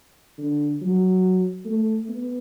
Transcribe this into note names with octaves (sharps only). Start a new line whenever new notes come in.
D3
F#3
A3
B3